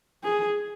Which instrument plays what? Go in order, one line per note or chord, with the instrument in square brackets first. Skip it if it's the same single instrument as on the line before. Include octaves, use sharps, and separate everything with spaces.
[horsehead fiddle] G#4